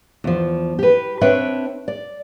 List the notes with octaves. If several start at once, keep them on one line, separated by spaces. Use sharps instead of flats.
E2 F3
G4 B4
C4 D4 B4 C#5 E5 G5
D5